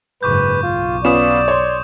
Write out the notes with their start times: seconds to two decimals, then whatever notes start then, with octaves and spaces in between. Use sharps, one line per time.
0.23 F#1 G#2 B4 C#6 D6 G6
0.63 B1 F4
1.05 B3 C#4 F4 D5 D#6 E7
1.48 C#5 C6